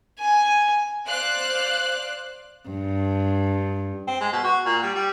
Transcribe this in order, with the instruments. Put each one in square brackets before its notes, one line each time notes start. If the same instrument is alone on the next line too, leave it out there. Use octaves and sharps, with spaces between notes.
[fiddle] G#5
[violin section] C5 D5 F5 F#6
[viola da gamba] G2
[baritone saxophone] C4
G#3
B2
F#4
A#2
G3
G3